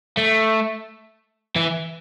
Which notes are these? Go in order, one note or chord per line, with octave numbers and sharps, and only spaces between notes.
A3
E3